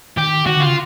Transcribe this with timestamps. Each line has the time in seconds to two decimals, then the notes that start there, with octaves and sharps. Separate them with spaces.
0.17 D#3 G4
0.46 D#3 F#4
0.57 D3 F4
0.66 C#3